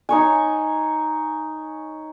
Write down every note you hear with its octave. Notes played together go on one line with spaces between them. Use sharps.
D#4 C#5 G#5